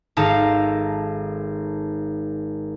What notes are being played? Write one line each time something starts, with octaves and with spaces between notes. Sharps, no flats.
G#1 D#4 A4 F5 A5 A#5